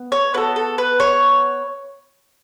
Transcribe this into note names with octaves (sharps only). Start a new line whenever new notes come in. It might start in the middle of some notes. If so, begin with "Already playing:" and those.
Already playing: B3
C#5
B3 F#4 A4 B4
A4
B4
C#5